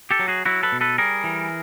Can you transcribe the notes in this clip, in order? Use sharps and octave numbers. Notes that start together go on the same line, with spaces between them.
G4 A4
F#3
F#4 G#4
F#3 E4 F#4
A4 B4
B2
A4 B4
G3 G#4 A#4
E3